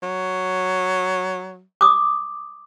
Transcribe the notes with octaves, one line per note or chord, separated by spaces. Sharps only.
F#3
D6 D#6